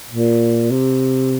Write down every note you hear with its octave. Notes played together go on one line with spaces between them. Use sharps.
A#2
C3